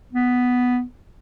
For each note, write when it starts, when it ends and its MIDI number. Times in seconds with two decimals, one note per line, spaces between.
0.13 0.83 59